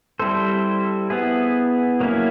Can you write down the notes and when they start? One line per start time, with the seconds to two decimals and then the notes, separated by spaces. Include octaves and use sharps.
0.19 G3 C4 E4 A4 C5
1.10 B3 E4 G#4
2.00 F#3 A#3 C#4 E4